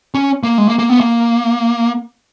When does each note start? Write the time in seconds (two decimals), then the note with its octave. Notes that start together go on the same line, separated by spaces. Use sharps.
0.14 C#4
0.43 A#3
0.58 G#3
0.68 A#3
0.79 A#3
0.89 B3
1.00 A#3